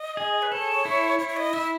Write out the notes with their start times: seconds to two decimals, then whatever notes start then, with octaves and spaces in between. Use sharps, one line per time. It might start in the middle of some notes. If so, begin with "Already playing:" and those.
Already playing: D#5
0.17 G#4
0.42 B4
0.52 A4 C#5
0.85 E4
1.19 E4 C#5
1.29 C#5
1.37 D#5
1.53 E4 E5